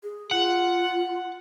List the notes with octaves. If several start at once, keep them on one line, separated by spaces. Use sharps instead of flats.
G#4
F4 F#5